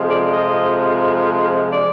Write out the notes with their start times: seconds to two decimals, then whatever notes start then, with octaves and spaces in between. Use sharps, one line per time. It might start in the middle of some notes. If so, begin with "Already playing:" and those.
Already playing: F2 C3 F3 G#3
0.08 D5
0.32 D#5
1.72 D5